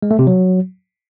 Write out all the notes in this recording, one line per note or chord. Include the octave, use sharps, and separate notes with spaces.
G#3
A3
C3
F#3